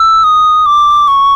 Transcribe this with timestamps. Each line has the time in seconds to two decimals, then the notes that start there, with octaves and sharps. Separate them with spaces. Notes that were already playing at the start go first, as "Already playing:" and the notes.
Already playing: E6
0.24 D#6
0.66 D6
1.08 C#6